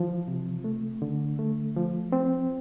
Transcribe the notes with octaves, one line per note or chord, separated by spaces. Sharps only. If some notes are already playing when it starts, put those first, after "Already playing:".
Already playing: E3 F3
C3
A3
D3
A3
F3
C4